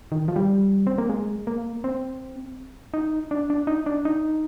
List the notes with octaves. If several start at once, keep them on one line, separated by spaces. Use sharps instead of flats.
D#3
F3
G3
C4
A#3
G#3
A#3
C4
D#4
D4
D4
D#4
D4
D#4